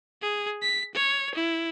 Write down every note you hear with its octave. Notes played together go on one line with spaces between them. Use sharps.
G#4
B6
C#5
E4